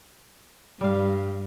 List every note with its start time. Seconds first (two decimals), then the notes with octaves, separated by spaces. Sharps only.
0.81 G2 G3 F5